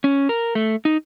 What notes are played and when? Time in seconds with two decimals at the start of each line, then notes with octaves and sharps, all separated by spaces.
0.04 C#4
0.29 A#4
0.55 A3
0.85 D#4